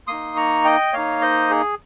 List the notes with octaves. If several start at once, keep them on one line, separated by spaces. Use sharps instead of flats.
A#3 D#4 C6 D#6
A#5 C#6
D#5 G5
A#3 D#4 C#5 F5
C5 D#5
G#4